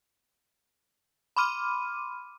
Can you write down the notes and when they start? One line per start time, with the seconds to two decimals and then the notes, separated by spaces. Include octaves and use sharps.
1.37 B5 C6 D6 F6 D#7